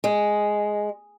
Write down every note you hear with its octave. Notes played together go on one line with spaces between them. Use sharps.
G#3